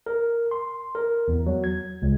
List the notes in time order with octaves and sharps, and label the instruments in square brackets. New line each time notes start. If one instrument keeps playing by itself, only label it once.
[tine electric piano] A#4
C6
A#4
E2
F#3
G#6
C#2